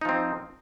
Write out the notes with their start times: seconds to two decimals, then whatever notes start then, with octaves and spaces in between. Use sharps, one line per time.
0.01 D#4
0.05 F3
0.09 C4